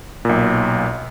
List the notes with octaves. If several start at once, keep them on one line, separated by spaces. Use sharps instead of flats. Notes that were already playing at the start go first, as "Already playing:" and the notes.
B1 A#2